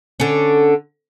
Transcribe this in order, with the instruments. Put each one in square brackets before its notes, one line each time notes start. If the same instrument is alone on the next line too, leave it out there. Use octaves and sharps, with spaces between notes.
[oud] D3 C#4